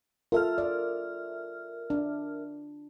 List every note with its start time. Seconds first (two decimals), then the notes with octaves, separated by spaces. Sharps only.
0.32 F4 A4 A#4 E5 F6
0.58 D5
1.90 D4